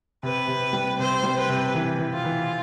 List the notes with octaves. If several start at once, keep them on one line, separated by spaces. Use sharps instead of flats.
C3 B4
C3
G3
C3 C5
G3
B4
C3
E3
E3
F4
E3